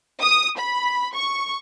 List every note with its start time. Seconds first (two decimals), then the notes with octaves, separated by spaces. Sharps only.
0.22 D#6
0.59 B5
1.14 C#6